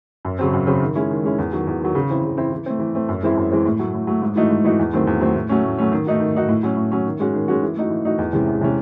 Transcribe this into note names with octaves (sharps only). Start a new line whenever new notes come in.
F#2
C#3 F#3 C4
F#2
C#3 F#3 C4
D#3
G#3 C#4 E4
D#3
G#3 C#4 E4
E2
D#3 F#3
E2
D#3 F#3
C#3
E3 C4 E4
C#3
E3 C4 E4
E3
A3 C4
E3
A3 C4
F#2
E3 G#3 C4 E4
F#2
E3 G#3 C4 E4
A2
F#3 A3
A2
F#3 A3
G#2
E3 A3 D#4 F#4
G#2
E3 A3 D#4 F#4
E2
D#3 F#3 A3 C4
E2
D#3 F#3 A3 C4
A2
F#3 A3 C#4
A2
F#3 A3 C#4
D#3
A3 D#4 F#4
D#3
A3 D#4 F#4
A2
F#3 C#4
A2
F#3 C#4
D#3
G#3 C#4 F#4
D#3
G#3 C#4 F#4
E3
A3 D#4 F#4
E3
A3 D#4 F#4
E2
C3 E3 G#3 C#4
E2
C3 E3 G#3 C#4